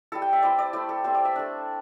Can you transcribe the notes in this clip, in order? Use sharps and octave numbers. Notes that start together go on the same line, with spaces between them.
G3 E4 A4
G5
E5
G3 C4 E4 D5
D5
A3 E4 D5
A4
G3 C4 E4 C5
D5
E5
A3 D4